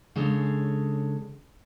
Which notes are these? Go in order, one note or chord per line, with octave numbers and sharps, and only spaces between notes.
C#3 G#3 D4 A4 C#5